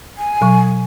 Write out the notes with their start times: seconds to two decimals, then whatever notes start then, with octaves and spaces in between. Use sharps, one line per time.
0.18 G#5
0.41 B2 F#3 C#6